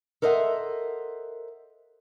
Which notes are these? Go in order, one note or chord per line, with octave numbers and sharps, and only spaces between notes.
A4 A#4 C5 D#5 E5 F#5